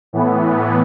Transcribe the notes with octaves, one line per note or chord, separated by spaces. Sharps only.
A2 E3 B3